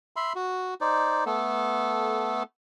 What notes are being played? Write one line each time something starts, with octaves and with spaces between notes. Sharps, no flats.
E5 B5 C6
F#4
D#4 C5 D5
A3 B3 A4